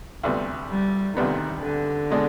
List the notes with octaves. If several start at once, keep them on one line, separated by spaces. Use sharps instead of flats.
D2 C3 G3 B3
G3
D2 C3 D#3 G3 B3
D3
B2 G#3 D4